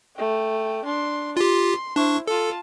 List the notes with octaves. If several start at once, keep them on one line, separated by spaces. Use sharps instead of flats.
A3 G5
D4 C6
F4 G4 C6
D4 E4 C5 C#6
F4 A4 A5